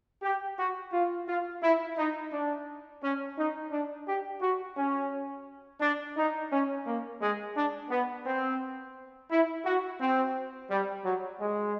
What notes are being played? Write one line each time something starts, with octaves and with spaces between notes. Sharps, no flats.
G4
F#4
F4
F4
E4
D#4
D4
C#4
D#4
D4
G4
F#4
C#4
D4
D#4
C#4
A#3
G#3
D4
B3
C4
E4
F#4
C4
G3
F#3
G#3